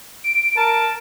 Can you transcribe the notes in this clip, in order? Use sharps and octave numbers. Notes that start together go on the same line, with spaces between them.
D7
A#4 A5